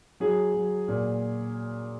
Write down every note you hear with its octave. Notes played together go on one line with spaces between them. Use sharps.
F#3 G#4
F#3
A#2